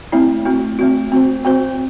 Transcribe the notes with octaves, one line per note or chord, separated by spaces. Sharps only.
A3 C4 E4
A3 C4 F#4
A3 C4 F#4
C4 F#4 C5
C4 F#4 C5